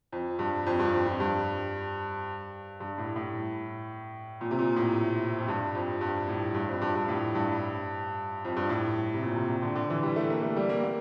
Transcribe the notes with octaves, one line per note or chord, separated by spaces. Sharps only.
F2
G2
F2
G2
F2
F2
G2
G2
A2
A2
A#2
C3
A#2
A2
F2
G2
F2
G2
A2
G2
F2
G2
G2
A2
G2
F2
G2
A2
C3
A#2
C3
C3
D3
D3
E3
G3
A3
A#3
A3
G3
A#3
A#3